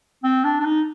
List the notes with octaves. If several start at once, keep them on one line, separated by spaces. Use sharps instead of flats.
C4
D4
D4
D#4